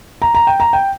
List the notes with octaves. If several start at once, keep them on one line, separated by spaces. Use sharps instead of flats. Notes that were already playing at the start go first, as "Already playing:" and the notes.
A#5
A#5
G5
A#5
G5